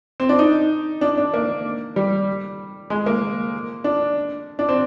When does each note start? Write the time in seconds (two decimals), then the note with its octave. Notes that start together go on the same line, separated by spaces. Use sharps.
0.20 C4
0.29 D4
0.39 D#4
1.01 D4
1.18 D4
1.34 A#3
1.96 G3
2.90 G#3
3.06 A#3
3.84 D4
4.59 D4
4.69 C4